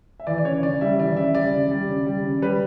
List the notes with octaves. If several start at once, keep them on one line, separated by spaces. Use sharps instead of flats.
E5
E3 D5
D5
C#3 C#5
C#3 D5
G3 E5
E3 D5
C#3 E5
G3 D5
C#3
G3
C#3
G3
C#3
G3 B4